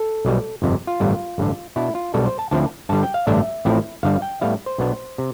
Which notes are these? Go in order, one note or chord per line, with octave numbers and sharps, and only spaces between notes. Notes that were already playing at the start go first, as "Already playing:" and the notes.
Already playing: A4
B1 B2 G3
G1 F2 C3
F4
A1 G2 D3 G3 B3
A1 G2 D3
B2 B3 D4 E4
F4
B1 B2 G3 D4 A4
C5
A5
D2 D3 F3 C4 E4 A5
G2 D3 G3 A5
G5
F5
A1 G2 D3 A3 D4 E5
A1 A2 F3 C4 E4
G1 G2 D3 G3 F5
G5
A2 G3 B3 E4 F5
C5
B1 B2 B3 D4
C3